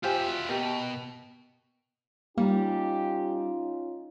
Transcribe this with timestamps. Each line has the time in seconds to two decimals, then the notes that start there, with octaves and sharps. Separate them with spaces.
0.04 F4 G4 C5 E5 G#5
0.29 F#4
0.48 B2 G4 A#4 D#5
2.38 G3 A#3 C#4 D#4 F4 G4